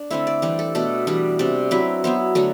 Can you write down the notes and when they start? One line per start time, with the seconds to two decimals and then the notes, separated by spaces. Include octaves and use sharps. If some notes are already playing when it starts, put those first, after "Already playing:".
Already playing: D4
0.10 D3 A3 C4 E4 E5
0.27 D5
0.42 E3 G3 D4 G4
0.59 A4
0.75 B2 A3 D4 A4
1.07 E3 G3 D4
1.39 C3 G3 D4
1.71 F#3 C4 E4 B4
2.04 F#3 B3 E4 C5
2.35 D3 F#3 A3